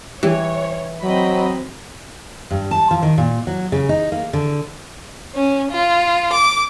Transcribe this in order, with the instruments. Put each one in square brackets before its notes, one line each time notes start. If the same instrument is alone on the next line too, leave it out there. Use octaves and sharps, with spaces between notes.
[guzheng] E3 [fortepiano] G3 [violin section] C#5
[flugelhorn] F#3 [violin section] C4 D#5 B5
[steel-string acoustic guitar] G2
A5
F3
D#3
A#2
F#3
C#3
D#4
A#3
D3
[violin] C#4
F4
D6